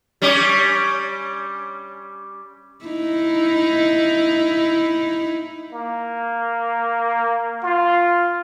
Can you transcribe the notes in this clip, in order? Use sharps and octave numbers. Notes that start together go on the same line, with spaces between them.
G3 C#4 G4
D#4 E4
A#3
F4